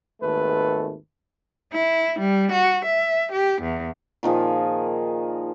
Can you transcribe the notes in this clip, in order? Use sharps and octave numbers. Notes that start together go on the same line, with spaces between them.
G#1 D#2 A3 A4 B4
E4
G3
F#4
E5
G4
E2
A#2 D#3 F3 G#4